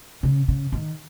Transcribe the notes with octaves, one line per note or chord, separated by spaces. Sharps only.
C#3
C#3
D#3